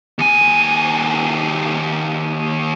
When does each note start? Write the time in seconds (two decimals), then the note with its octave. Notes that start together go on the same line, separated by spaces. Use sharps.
0.19 D#2 G#5